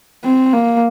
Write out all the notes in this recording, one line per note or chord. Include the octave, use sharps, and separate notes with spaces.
C4
A#3